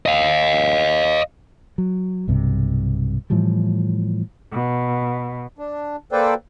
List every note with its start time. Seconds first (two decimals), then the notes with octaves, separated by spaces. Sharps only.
0.06 D#5 F5
1.78 F#3
2.28 B1 G2 C3
3.30 A2 E3 F3 G3
4.54 B2
5.58 D4
6.12 A#3 A4 B4 C5 D5 G5